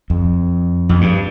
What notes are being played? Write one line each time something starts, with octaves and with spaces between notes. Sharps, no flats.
F2
F2
G2